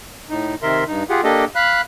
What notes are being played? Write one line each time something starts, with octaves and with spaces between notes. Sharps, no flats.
A2 D#4
C3 D#3 A#4 E5 C6
G2 D#4
F4 G4 G#4 F#5
A#3 D4 G4 A4 D#5
F5 B5 F#6